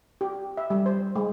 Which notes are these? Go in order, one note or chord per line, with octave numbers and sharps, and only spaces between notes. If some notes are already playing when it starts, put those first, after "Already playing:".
G4
E5
G3
C5
G#3